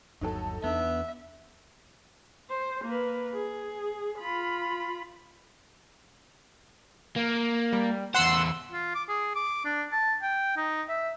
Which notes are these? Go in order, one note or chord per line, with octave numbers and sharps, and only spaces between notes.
G1 D#2 F#3 D#4 A4
E2 B3 D4 E5
C5
A#3 B4
G#4
F4 B5
A#3
G3
E2 C5 F#5 C6 E6
F4
D6
G#4
D6
D4
A5
G5
D#4
E5